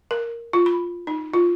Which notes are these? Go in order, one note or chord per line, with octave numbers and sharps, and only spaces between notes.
A#4
F4
B5
D#4
F4